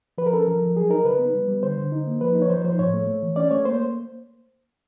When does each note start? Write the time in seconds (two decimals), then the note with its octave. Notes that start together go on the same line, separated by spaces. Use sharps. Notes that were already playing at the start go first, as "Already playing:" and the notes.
0.18 F3 B4
0.27 A#4
0.33 C#4 A4
0.43 F3 A#4
0.62 F3
0.75 F#3 G#4
0.90 D#4 A#4
1.04 C#3 B4
1.19 B3
1.34 G3
1.48 G3
1.63 D3 C5
1.77 D3
1.92 D#4
2.07 A#3
2.21 F3 B4
2.35 D#4
2.42 C#5
2.50 F3 C5
2.65 F3 C5
2.79 A2 C#5
2.94 A3
3.07 A3
3.22 E3
3.36 C#4 D5
3.51 A3 C#5
3.65 A#3 C5